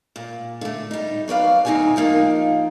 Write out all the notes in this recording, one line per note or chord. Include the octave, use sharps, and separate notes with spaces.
A#2
D3 A3
G3 D#4
F#3 B4 D5 F5
D2 C4 D#4 G4 C#5 G#5
F3 A#3 D#4 F4